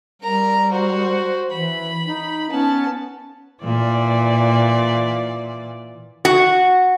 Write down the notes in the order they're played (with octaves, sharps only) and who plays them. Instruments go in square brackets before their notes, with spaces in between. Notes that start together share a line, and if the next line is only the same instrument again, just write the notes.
[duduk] G3 [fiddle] A#4 A#5
[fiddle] F#4 C5
[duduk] E3 [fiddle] B5
[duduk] D#4
[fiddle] B3 A5 [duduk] C#4
[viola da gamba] A#2 E3 D5
[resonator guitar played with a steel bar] F#4